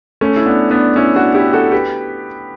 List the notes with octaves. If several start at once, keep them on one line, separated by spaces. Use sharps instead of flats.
A3 C#4
E4
B3 D4
B3 D4
C#4 E4
D4 F#4
E4 G4
F#4 A4
G4 B4